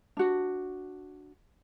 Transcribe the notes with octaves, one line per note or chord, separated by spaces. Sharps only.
D4 F#4